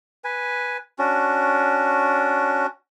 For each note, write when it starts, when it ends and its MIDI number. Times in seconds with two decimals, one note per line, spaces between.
0.24 0.77 71
0.24 0.77 80
0.99 2.66 61
0.99 2.66 62
0.99 2.66 66